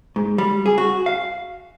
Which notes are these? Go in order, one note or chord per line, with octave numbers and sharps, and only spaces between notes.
G#2
G3
G#4
F#4
F5